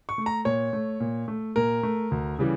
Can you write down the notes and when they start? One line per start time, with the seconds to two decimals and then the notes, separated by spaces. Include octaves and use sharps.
0.09 C#6
0.18 A3
0.26 A#5
0.45 A#2 C#5
0.73 A3
1.00 A#2
1.28 A3
1.56 A#2 A#4
1.83 A3
2.11 D2
2.39 C#3 E3 G3